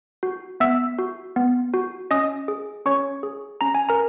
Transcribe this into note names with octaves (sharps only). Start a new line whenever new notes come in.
F#4
B3 E5 E6
F#4
B3
F#4
C#4 D#5 D#6
G#4
C#4 C#5 C#6
G#4
C#4 A#5
G#5
A#4 A#5